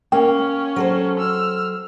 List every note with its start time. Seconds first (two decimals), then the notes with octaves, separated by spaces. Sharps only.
0.12 A#3 C#4 G5
0.76 F#3 A4 C5
1.20 E6 F6